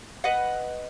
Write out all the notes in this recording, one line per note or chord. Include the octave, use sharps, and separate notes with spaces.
B4 D#5 F#5